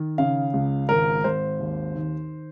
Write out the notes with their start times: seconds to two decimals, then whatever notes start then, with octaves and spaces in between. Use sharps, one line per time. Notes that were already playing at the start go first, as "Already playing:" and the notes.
Already playing: D#3
0.18 C#3 F5
0.53 C#2
0.89 G#1 A#4
1.24 G#1 C5
1.59 D#2
1.95 D#3